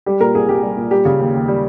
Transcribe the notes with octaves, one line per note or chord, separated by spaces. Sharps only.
G3 G4
A#2 A#4
C2 G#4
C2 G4
G3
A#2
G3 G4
C#3
D#2
D#2
G3